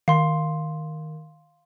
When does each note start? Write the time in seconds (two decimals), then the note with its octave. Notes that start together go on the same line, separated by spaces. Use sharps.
0.08 D#3 F5 C6